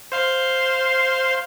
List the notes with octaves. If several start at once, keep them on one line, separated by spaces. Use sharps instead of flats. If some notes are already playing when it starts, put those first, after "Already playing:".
C5 F5 C6